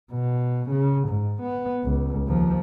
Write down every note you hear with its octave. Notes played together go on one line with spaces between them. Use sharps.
B2
C#3
G#2
B3
C#2
D#2 F3